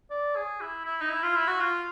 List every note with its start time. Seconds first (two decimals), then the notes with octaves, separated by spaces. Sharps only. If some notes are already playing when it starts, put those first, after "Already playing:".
0.10 D5
0.36 G#4
0.61 E4
0.85 E4
1.01 D#4
1.10 E4
1.23 F4
1.36 E4
1.48 F#4
1.60 F4